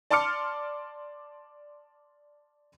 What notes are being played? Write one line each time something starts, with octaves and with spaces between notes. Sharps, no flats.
D5 A5 C6 D6 F6 C#7